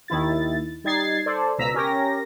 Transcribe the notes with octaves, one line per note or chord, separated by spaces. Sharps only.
D#2 D#3 E4 A6
G3 D#4 G#6 A6 C7
A4 C5 D5
C#2 B2 A#5 E6 B6
C#4 G4 A#4 A#6